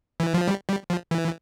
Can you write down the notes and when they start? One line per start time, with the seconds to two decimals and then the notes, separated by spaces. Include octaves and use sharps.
0.20 E3
0.34 F3
0.47 G3
0.69 G3
0.90 F3
1.11 E3